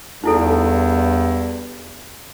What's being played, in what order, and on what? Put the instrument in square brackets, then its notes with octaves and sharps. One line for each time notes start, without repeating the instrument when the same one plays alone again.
[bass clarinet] E2 [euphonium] G2 [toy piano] D#4 E4 A4